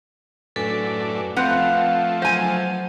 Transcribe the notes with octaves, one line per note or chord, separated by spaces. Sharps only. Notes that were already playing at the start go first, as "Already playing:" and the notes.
F#2 A2 D4 A4 B4 G#5
F3 A3 C4 B4 F5 F#5
F#3 C5 G#5